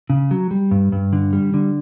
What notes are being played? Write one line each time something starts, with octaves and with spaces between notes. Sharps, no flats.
C#3
F#3
G3
G2
G2
D3
G3
D3